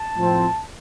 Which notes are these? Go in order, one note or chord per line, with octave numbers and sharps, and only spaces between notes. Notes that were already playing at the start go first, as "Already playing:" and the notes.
Already playing: A5
A2 F3 C4